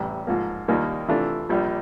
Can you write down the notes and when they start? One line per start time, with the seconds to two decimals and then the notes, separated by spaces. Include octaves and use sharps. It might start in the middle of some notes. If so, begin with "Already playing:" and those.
Already playing: A1 A2 E3 G3
0.27 G#2 F3 A#3
0.68 D#2 D#3 G3 A#3
1.08 C3 E3 A3 D4 F4
1.49 A#1 A#2 G3